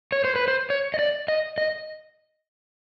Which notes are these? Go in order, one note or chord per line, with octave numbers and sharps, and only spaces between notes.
C#5
C5
B4
C5
C#5
D#5
D5
D#5
D#5